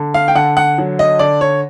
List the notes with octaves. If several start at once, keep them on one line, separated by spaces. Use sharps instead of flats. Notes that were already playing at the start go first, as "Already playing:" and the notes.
Already playing: D3
F5
G5
D3 F#5
F#5
F#3
D#5
D3 D5
C#5